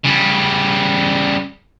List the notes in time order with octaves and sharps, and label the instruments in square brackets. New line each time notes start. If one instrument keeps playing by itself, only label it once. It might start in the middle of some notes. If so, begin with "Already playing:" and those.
[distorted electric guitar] C#3 G3